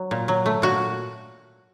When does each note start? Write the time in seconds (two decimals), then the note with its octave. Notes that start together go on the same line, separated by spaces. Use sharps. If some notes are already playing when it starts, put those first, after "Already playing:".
Already playing: F#3
0.11 A#2
0.28 F#3
0.46 A3
0.62 A#2 F#4